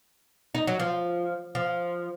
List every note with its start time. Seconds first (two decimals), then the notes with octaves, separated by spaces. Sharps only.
0.55 D#4
0.67 F#3
0.80 F3
1.55 F3